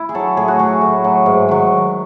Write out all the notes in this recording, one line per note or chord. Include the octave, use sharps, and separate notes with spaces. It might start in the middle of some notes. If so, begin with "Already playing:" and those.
Already playing: E4
G#4
F#3 A4
A2 G#4
F#4
F#3 G#4
A2
F#3
G#2
D#3 F#3